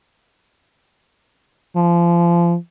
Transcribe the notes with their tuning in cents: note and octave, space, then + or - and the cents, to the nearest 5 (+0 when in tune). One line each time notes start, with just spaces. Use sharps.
F3 -25